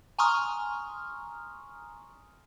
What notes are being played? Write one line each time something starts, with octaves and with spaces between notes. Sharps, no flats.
G#5 A#5 C6 C#6 D#6 F6